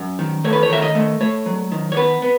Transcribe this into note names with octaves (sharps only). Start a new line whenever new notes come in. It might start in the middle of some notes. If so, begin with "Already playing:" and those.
Already playing: F#2
D#3
A3 C#5
B4
C#5
D#3 E5
D#5
A3
A3 C#5
F#3
D#3
C#5
B3 B4
B3